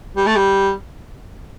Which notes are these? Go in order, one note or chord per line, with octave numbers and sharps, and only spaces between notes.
G3
A3
G3